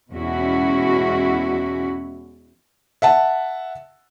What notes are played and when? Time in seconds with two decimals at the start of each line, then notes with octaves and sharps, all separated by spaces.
0.11 E2 B2 G#3 C#4 E4 F#4
3.02 E5 F#5 A5